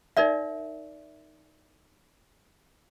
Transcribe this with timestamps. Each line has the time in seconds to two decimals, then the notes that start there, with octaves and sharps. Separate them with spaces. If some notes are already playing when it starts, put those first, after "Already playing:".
0.17 D#4 A#4 D5 E5